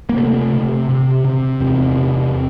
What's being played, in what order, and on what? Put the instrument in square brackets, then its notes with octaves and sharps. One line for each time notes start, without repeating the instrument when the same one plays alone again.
[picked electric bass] A#3
C3 A3
C3
C3
C3
E2 C4
C3